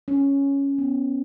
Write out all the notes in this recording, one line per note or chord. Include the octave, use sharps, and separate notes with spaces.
C#4
B3